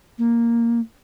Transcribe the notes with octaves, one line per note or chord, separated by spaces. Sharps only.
A#3